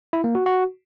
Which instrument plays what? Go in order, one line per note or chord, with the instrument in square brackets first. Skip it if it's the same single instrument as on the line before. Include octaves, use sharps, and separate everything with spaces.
[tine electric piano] E4
A#3
F#4
F#4